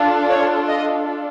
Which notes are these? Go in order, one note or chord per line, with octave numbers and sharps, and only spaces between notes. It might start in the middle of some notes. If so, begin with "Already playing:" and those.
Already playing: D4 F4 A4
C#5
D#5